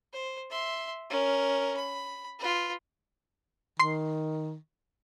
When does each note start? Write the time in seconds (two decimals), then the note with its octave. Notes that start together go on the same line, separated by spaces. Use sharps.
0.13 C5
0.50 E5 C6
1.10 C#4 A#4
1.76 B5
2.39 F4 B4
3.79 D#3 C6 C7